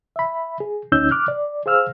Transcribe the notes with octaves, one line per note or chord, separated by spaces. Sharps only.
E5 B5
G#4
D2 C#4 D#4 E6 G6
D6 F6 F#6
D5
G#4 C5 F5 E6 F6